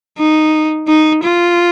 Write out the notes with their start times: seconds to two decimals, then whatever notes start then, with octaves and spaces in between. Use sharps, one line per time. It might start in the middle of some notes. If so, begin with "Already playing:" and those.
0.18 D#4
0.88 D#4
1.23 F4